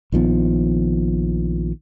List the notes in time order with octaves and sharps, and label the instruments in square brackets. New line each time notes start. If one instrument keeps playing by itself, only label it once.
[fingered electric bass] A#1 D#3 F3 B3